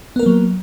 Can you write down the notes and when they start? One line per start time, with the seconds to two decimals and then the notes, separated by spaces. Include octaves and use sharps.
0.16 B3
0.19 A#4
0.23 A#3
0.26 F#3